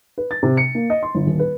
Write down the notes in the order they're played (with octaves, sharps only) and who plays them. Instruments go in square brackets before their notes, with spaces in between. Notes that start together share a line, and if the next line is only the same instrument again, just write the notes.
[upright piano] B4
A6
C3
C#7
A#3
D#5
C6
G1
D#1
B4